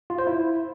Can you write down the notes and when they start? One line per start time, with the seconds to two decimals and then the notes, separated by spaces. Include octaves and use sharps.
0.10 F4
0.19 C5
0.27 E4